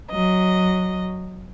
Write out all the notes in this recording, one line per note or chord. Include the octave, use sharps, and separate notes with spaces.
F#3 D#5